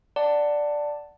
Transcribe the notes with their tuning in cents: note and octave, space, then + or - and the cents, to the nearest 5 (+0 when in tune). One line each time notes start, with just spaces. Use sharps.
D5 +0 F#5 +0 A5 +15